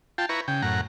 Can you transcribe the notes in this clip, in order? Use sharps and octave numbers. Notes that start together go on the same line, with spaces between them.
F4 G5 A5
E4 B4 A#5 C#6
C#3 G5
F#2 A2 F#5 A#5